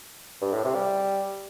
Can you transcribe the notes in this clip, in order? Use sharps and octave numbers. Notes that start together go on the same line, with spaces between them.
G2
A2
C3
G3